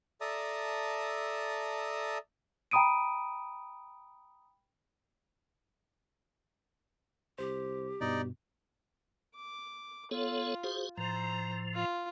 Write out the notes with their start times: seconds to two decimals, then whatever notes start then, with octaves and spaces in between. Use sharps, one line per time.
0.21 A4 D5 E5 A5 A#5 D#6
2.71 G5 A#5 B5 D#6 D7 D#7
7.39 C2 G4 C5
8.01 G2 B2 B3 D#4 D5
9.35 D6
10.11 B3 F4 A4 C#5
10.64 F#4 G#4 C5
10.98 A2 F3 C5 A#5
11.74 F4